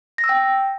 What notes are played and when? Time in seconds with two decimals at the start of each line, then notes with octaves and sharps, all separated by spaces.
0.18 A#6
0.24 E6
0.29 G5